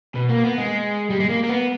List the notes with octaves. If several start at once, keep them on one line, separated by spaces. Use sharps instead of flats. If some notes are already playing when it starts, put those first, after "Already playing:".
B2
A#3
B3
G#3
G3
G#3
A#3
A#3
B3